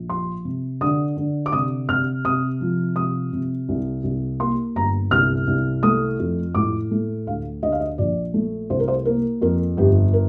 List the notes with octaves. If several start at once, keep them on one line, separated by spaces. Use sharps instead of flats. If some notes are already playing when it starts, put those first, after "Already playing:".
Already playing: A#1
F3 C6
C3
D3 D#6
D3
D6
C3 D#6
C3 F6
C3 D#6
F3
C3 D#6
C3
C2
C2
A#3 C6
G1 A#5
C2 F6
C2
A3 D#6
F2
A2 D6
A3
D2 F5
D2 D#5
F5
D#5
A#1 D5
A3
C2 C5
A#4
C5
A#3 A#4
F2 A#4
G1 G4
A#4